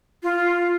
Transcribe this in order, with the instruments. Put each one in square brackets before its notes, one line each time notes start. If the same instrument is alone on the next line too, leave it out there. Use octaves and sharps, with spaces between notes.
[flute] F4